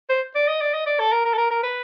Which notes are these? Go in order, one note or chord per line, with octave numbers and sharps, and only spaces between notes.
C5
D5
D#5
D5
D#5
D5
A4
A#4
A#4
A4
A#4
A#4
B4